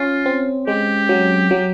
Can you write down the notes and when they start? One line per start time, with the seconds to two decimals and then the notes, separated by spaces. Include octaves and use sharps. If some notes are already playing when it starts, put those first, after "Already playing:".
Already playing: C#4 F4
0.26 C4
0.67 G#3 G4
1.09 F#3
1.51 F#3